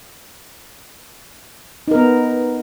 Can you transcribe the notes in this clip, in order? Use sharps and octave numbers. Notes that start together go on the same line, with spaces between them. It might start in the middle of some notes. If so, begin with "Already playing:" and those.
B3 D#4 A#4